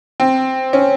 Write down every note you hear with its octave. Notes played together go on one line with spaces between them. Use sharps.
C4
C#4